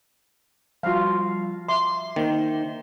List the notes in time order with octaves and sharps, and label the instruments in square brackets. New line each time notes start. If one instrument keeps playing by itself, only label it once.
[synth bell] F3 G3 F#4 [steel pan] F4 F5
[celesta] E5 [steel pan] C6 [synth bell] D6
[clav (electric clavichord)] D#3 [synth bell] A#3 C5 G7